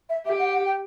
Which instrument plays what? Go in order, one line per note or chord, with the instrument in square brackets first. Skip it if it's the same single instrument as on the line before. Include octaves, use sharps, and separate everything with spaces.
[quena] E5
[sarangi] G4 [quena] E5
[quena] F#5
F#5
G5